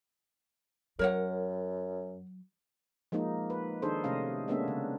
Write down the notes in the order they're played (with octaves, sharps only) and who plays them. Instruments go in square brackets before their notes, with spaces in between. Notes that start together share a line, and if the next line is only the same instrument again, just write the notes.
[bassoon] F#2 [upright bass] F#3 [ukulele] A#4 C#5 F#5
[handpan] F3 G#3 A#3 D#4
B4
D#3 D4 D#4 G#4 A4 C5
C3 A3 C#4 D#5 F5
G#3 A#3 B3 C#4 D4 E5
C#3